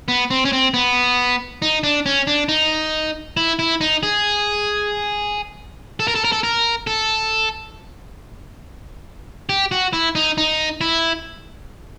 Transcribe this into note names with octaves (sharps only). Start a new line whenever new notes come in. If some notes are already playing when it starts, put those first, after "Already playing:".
B3
C4
C#4
C4
B3
D#4
D4
C#4
D4
D#4
E4
E4
D#4
G#4
A4
A#4
A4
A#4
A4
A#4
A4
G4
F#4
E4
D#4
D#4
E4